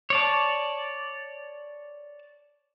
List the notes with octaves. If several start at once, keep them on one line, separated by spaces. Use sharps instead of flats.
C#5 D5 A5